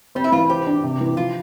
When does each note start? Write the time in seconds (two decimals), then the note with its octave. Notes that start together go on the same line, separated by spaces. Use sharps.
0.15 G3 C4
0.24 E4
0.32 E3 F4
0.50 G4 C5
0.67 D4
0.83 C3
1.01 E3
1.17 F3 F4